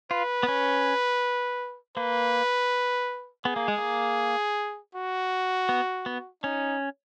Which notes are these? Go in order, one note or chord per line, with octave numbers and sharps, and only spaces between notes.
F4 B4
B3
C#4
A#3 B4
B3 G#4
A#3
G#3
A#3
F#4
B3
B3
C#4 D#4